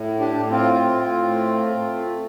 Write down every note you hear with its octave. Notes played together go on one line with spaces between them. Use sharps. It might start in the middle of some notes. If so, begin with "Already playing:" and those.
Already playing: A2
D4 G4
A2
C4 F4
A2
A3
A3